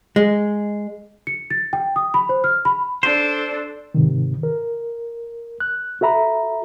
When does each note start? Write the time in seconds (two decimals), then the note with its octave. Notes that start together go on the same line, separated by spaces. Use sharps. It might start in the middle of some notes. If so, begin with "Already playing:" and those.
0.16 G#3
1.27 C#7
1.50 A6
1.73 G5
1.96 D#6
2.14 B5
2.29 C5
2.44 F6
2.65 B5
3.03 D4 A4 C5
3.95 G#2 C3 D#3
4.43 A#4
5.60 F#6
6.01 F#4 A4 E5 A#5 B5